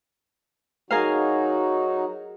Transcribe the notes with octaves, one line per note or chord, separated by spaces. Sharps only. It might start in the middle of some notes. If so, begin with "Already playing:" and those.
F#3 D#4 F#4 G#4 A#4 F5